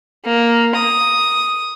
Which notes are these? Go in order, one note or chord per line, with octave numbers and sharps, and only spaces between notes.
A#3
D#6